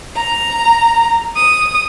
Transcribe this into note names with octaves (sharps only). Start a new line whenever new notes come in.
A#5
D#6